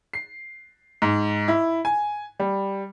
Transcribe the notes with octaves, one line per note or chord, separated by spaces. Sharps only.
C7
G#2
E4
G#5
G3